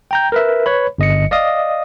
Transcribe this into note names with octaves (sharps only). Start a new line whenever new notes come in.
G5 A#5 G6
A#4 B4 E5
B4 C#5 B5
G1 D#5 C#7
D5 D#5 F5 D#6